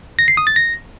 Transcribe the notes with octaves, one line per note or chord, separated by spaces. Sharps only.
A#6
C7
D#6
A6
A#6